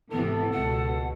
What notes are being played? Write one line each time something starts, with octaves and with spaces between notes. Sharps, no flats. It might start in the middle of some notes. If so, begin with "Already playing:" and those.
G#1 C3 E3 B3 A4
C#2 B2 F#5